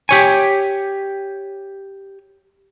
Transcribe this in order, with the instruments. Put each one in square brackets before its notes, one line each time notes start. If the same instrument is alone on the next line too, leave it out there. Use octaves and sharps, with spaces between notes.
[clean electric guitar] G4 C#5 G#5